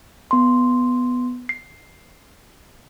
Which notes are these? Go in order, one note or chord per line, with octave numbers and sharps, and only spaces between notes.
B3 C6
C7